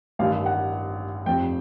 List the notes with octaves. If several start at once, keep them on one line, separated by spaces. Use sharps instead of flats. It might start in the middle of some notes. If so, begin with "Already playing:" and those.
A1 G2 D#3 F5
F#5
F1 F2 C3 G5